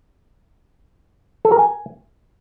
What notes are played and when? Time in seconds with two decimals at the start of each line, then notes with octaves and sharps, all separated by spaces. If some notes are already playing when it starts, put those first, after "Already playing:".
1.45 A4
1.52 A#4
1.59 G#5